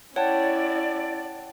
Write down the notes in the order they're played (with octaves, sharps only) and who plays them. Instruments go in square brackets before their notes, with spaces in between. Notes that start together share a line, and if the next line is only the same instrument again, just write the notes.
[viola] C#4 E4 [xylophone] C#5 [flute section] D5 [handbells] F#5 G5 A5